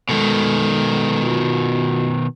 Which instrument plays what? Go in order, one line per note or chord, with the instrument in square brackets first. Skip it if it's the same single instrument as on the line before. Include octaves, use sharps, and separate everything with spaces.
[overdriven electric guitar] B2 D#3 [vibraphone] G#3 A4
[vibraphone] F4 F#4